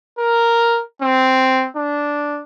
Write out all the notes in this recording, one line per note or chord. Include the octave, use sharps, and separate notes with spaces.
A#4
C4
D4